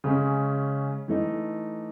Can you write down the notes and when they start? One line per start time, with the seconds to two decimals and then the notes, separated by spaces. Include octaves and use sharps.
0.04 C#3 G#3 C#4
1.08 E3 A3 D#4